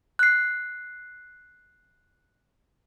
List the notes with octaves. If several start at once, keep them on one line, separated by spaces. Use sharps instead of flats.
F#6 C7